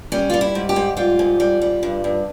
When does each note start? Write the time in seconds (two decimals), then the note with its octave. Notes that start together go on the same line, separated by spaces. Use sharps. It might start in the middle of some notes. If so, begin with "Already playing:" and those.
0.12 G3 C#4
0.30 G3 F4
0.41 E4
0.55 G#2
0.69 G4
0.76 G#2
0.97 G3 F4
1.19 G#2
1.40 G3
1.61 G3
1.83 G2
2.04 G2